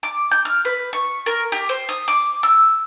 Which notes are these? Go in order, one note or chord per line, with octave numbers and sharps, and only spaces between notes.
D6
G6
F6
B4
C#6
A#4
G4
C5
D#6
D6
E6